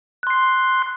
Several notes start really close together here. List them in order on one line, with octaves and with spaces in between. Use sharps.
F#6 C6 C7